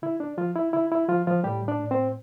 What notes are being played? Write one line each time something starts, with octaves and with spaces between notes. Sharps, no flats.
D3 E4
D4
F3 F4
E4
D3 E4
E4
F3 F4
F3 F4
A2 G3 G4
D4 D5
A2
C4 C5